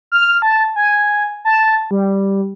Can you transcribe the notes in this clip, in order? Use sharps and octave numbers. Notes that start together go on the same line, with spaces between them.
F6
A5
G#5
A5
G3